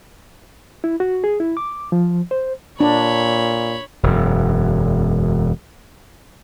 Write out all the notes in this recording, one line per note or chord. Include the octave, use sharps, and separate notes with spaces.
E4
F#4
G#4
E4
D6
F3
C5
A#2 D4 C#5 B5
E1 F#2